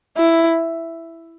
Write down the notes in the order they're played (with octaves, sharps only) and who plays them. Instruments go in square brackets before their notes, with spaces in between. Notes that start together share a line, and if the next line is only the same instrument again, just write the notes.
[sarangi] E4